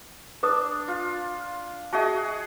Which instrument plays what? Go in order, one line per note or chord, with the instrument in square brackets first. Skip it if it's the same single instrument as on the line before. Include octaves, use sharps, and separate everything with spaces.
[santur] D4 [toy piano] B4 D6 D#6
[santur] F4
[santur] F#4 G#4 D#5 [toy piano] E5 A5